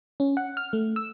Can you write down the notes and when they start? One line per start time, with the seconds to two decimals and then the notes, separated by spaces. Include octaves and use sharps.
0.20 C#4
0.37 F#5
0.57 F6
0.73 A3
0.96 E6